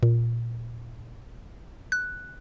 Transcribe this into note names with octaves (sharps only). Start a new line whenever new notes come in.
A#2
F#6